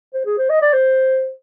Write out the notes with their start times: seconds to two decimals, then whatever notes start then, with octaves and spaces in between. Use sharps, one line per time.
0.14 C5
0.25 G#4
0.38 C5
0.49 D#5
0.62 D5
0.73 C5